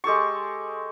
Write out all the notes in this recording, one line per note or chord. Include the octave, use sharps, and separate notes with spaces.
G#3 G4 A4 C#6